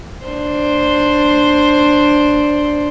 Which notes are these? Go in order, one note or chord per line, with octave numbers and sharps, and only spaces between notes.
D4 C5